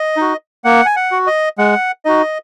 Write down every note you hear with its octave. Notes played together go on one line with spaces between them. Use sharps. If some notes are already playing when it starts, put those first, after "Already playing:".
Already playing: D#5
D#4 F#4
A#3 F#5
G#5
F#5
F#4
D#5
G#3 F#5
D#4 F#4 D#5